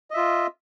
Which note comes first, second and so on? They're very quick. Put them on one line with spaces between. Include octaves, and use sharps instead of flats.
D#5 E5 F4